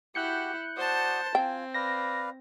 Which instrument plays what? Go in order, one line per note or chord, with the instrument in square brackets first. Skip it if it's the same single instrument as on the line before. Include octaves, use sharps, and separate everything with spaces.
[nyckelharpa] E4 [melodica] F#4 G4 [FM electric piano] F#6 G6 C#7
[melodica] F#4 D5 D#6 [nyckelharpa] C5 A5
[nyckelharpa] C4 [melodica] F4 G#5 [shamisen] G5
[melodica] B4 D5 F5 [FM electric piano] A#6